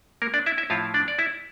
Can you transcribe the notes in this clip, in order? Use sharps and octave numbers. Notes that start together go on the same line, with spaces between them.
A#3 A#4
D4 D5
E4 E5
E4 E5
A2 F3 C4 E4 F4 F5
D4 D5
D5
E4 E5